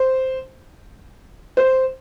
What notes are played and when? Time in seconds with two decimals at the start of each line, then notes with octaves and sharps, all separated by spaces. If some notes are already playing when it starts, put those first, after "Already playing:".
Already playing: C5
1.57 C5